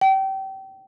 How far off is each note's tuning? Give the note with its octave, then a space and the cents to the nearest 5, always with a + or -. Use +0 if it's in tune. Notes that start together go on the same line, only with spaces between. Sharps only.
G5 -30